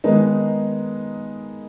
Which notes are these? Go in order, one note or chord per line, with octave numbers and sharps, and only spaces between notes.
D#3 G#3 B3 D#4